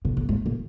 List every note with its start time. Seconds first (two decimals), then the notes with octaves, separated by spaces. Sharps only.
0.05 B2
0.17 A#2
0.29 G#2
0.46 A#2